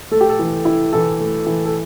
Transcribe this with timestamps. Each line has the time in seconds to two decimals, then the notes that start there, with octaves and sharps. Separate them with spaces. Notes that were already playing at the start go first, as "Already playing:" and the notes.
0.11 A3 A4
0.21 G4
0.29 A4
0.39 E3
0.65 E4
0.93 E3 A4
1.20 A3
1.46 E3
1.65 A4